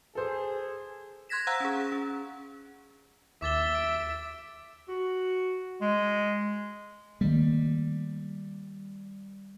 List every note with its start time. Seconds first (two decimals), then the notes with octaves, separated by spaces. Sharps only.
0.15 G#4 A4 C5
1.29 C6 F#6 G#6 A#6 B6 E7
1.47 C5 F5 F#5 A#5 E6 F#6
1.60 C#4 G#4
1.92 C#4
3.42 D#2 E5 D6 A6 G7
3.75 D7
4.89 F#4
5.81 G#3
7.21 D#3 G3 A3 A#3